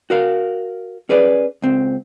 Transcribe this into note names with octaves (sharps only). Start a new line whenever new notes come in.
F#4 A#4 F5
C#4 G#4 B4 D5
C#2 C4